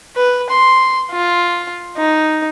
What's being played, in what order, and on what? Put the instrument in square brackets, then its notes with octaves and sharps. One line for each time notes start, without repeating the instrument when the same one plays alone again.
[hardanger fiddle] B4
C6
F4
D#4